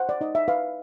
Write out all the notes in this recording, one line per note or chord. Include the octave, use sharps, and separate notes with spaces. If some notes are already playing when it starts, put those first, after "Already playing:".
Already playing: C5 F#5
D5
D#4 D#5
E5
B4 F5